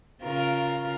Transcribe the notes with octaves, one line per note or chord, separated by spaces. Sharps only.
C#3 F4 A#4